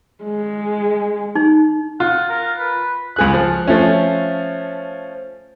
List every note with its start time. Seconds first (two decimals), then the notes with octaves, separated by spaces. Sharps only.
0.24 G#3
1.35 D#4
2.00 F4 F#5
2.29 A#4
2.58 B4
3.16 C#2 G#4 F#6
3.33 F3
3.67 F3 A3 C#4